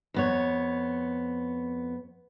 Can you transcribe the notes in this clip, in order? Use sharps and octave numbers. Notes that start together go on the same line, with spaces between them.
F2 B3 C#5